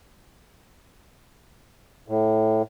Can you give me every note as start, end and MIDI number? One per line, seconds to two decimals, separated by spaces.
2.08 2.62 45